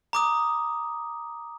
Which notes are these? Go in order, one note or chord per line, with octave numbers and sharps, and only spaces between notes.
A#5 D6 D#6